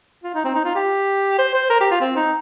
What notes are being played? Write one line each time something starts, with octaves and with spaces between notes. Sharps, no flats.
F4
D#4
C4
D#4
F4
G4
C5
C5
A#4
G4
F4
C4
D#4